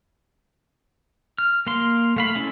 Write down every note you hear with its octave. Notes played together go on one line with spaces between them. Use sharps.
F6
A#3 F5 C6
A3 F5 B5
G#3 C#4 E4 A4